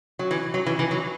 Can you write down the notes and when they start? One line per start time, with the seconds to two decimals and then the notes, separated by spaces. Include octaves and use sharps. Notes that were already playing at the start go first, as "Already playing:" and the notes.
0.19 F#3
0.31 E3
0.54 F#3
0.67 E3
0.79 E3
0.91 F#3